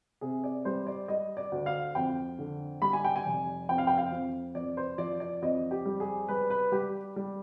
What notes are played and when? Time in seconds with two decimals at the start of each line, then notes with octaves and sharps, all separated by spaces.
0.21 C3 G#4
0.44 D5
0.65 G3 C5
0.87 D5
1.08 G3 D#5
1.37 D5
1.52 D2
1.66 F5
1.95 F2 G5
2.39 D3
2.82 G3 B5
2.93 G#5
3.05 G5
3.16 G#5
3.26 F1
3.69 F2 G5
3.78 F5
3.87 G5
3.98 F5
4.12 F2
4.55 F2 D5
4.77 C5
4.98 F3 D5
5.20 D5
5.42 F2 D#5
5.71 G4
5.85 G3
6.00 G#4
6.28 G3 B4
6.50 B4
6.72 G3 G4
7.16 G3